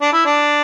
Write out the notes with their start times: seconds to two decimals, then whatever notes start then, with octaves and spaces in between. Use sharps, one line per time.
0.01 D4
0.13 E4
0.26 D4